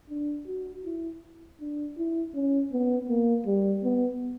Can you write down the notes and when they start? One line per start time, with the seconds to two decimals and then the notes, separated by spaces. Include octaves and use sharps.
0.10 D4
0.47 F#4
0.85 E4
1.61 D4
1.98 E4
2.35 C#4
2.72 B3
3.09 A#3
3.46 G3
3.84 B3